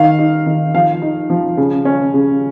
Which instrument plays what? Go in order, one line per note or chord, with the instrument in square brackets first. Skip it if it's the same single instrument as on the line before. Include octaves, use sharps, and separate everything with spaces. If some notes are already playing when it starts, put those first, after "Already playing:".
Already playing: [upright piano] D#3 F5
D#4
D#3
F3 F5
D#4
F3
C#3
C#4
C#3